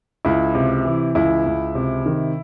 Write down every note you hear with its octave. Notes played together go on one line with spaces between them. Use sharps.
C#2 E4
C3
E3
C#2 E4
C#2
C3
D#3